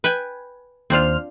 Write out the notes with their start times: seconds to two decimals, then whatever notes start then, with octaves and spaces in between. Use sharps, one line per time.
0.04 B4 G5 G#5
0.90 D#2 C4 D4 F4 C5 F6